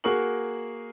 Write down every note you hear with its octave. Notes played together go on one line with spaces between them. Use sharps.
A#3 F#4 G#4 A#4 C#6 F#7